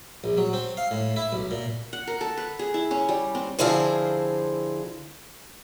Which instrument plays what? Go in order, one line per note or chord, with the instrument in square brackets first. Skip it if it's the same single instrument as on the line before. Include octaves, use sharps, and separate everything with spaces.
[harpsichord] A#1
F#3
C4
F5
A2
E4
B1
A#2
[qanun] F#5
A#4
A4
B4
G#4
E4
C#4
G3
C4
[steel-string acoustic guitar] D3 F3 C4 E4 G#4 C5